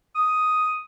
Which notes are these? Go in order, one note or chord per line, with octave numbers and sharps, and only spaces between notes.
D#6